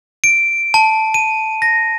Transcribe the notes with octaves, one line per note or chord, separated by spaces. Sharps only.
D7
A5
D#7
A#6